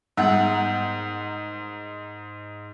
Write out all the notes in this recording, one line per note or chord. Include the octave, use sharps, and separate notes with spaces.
G#2 G3 B3 G#4 A#4 F#5 G5